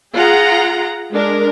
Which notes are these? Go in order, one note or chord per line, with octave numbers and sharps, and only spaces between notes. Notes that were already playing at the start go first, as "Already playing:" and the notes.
F4 G#4 F#5 A#5
G#3 D4 A#4